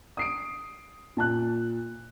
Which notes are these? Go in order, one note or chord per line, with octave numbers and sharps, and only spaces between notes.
D#6 C7 D7
A#2 A5 F#6